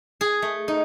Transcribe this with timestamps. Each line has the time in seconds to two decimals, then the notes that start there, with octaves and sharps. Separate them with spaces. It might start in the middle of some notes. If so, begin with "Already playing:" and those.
0.21 G#4
0.42 A3
0.68 D#4